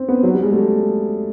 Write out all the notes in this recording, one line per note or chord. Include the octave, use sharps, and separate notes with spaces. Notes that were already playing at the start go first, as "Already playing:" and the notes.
Already playing: C4
B3
F#3
G3
G#3
A3